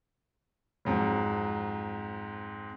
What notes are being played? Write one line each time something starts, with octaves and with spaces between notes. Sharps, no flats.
F2 G#2 F#3